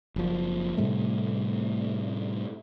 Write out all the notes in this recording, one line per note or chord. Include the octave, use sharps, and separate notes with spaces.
F#1 F3
A2 C3 G3 A3